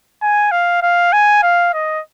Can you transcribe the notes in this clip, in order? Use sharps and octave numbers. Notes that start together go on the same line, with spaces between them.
G#5
F5
F5
G#5
F5
D#5